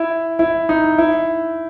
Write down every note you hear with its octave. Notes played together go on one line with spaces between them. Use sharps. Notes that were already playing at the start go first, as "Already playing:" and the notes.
Already playing: E4
E4
D#4
E4